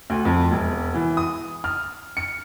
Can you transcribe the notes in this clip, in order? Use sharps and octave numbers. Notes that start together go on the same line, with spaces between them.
D2
F2
E1
E3
D#6
F6
C#7